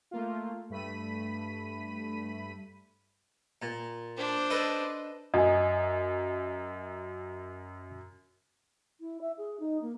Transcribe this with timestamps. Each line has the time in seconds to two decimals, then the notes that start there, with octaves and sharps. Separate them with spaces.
0.11 A3 A#3 F4
0.70 G2 A3 B5 B6 D#7
3.62 A#2
4.16 D4 C5
4.50 A4 B4 D#5
5.34 F#2 D#5 G#5
9.00 E4
9.21 E5
9.37 G#4
9.59 D#4
9.81 A#3